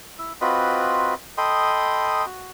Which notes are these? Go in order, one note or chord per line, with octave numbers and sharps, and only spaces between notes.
E4
C4 F4 F#4 B4 D#5 B5
A4 D#5 G5 B5 C6 D#6
F#4